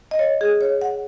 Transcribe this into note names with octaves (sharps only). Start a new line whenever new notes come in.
D#5
C#5
G#4
C#5
F#5